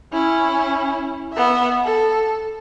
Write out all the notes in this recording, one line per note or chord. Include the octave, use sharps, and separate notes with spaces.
C#4 E4
B3 E5
A4